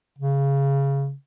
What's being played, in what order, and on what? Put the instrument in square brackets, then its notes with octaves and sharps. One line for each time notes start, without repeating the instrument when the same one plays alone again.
[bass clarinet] C#3